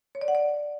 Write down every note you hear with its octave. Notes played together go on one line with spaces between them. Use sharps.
C#5
D5
F#5
D5